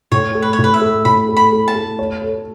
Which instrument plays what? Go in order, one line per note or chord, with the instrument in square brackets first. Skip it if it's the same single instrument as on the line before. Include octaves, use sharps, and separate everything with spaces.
[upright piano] A2 [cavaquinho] C#5
[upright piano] A3
[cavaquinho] B4
C#5
[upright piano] A2
[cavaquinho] B4
E5
[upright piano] A3
[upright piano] A2 [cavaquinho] B5
[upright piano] A3
[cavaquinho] B5
[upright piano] A3
[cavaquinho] A5
[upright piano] A3
C#5
A4